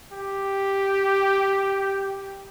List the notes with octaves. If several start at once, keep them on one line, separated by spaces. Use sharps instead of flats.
G4